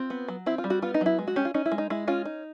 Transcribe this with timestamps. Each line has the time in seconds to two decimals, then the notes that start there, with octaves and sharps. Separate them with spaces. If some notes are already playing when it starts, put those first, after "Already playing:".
Already playing: C4 F4
0.10 B3
0.28 F#3
0.46 C4 E4
0.58 F4
0.64 G3
0.70 F#4
0.82 B3 F4
0.94 D#4
1.01 F#3 E4
1.18 G#3
1.28 F#4
1.36 C#4 G4
1.45 F4
1.54 C#4 D#4
1.66 E4
1.72 G#3
1.78 D#4
1.90 G#3 E4
2.07 C#4 F4
2.25 D#4